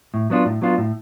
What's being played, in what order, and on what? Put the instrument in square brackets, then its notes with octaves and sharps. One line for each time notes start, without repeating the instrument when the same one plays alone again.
[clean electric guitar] A2
F#3 B3 D4 F4
A2
F#3 B3 D4 F4
A2